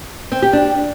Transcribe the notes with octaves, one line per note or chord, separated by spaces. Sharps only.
C4
G4
D4